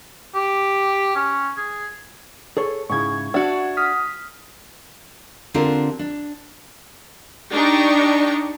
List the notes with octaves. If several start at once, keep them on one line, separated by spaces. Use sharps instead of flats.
G4
C#4
G#4
G#4 A4 C#5
G#2 C#3 E4 C#6 G#6
D4 F#4 E5 F#5
D#6 F6 B6
D3 C4 D4 F4 G4 A#4
D4
D4 D#4 G4 C#6